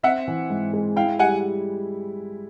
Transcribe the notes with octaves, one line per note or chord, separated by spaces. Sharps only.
C4 E5 F#5
E3
G#2
G#3
E4 F5 G5
G3 F#5 G#5